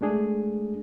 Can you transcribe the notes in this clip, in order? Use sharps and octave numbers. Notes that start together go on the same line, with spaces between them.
G#3 A3 D4 G#4